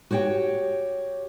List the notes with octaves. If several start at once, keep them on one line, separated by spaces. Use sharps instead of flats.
F#4 G4 C#5 E5 G5